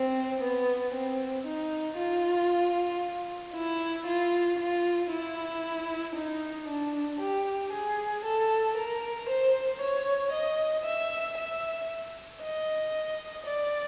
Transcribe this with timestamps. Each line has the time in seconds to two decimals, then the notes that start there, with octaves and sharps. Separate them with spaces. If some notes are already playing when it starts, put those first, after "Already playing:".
Already playing: C4
0.41 B3
0.94 C4
1.47 D#4
1.98 F4
3.55 E4
4.07 F4
4.59 F4
5.11 E4
6.15 D#4
6.68 D4
7.20 G4
7.73 G#4
8.24 A4
8.77 A#4
9.29 C5
9.81 C#5
10.33 D#5
10.85 E5
11.37 E5
12.42 D#5
13.46 D5